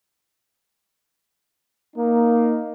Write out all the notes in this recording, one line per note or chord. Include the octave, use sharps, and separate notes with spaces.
A#3 D#4